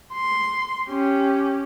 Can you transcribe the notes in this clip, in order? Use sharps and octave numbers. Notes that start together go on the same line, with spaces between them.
C6
C#4 G4